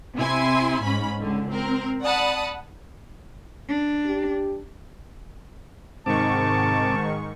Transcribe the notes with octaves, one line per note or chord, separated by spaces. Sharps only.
C3 E4 G#5 C6
G#2 C#4 B5
C#2 D3
C4 A#4
D5 F#5 A5 B5 D#6
D4
G4
G#2 C3 D#3 C4 A5 C#6 D6